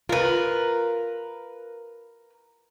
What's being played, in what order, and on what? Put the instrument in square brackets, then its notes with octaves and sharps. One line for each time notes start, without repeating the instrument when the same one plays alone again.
[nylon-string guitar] F4 [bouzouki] A#4 B4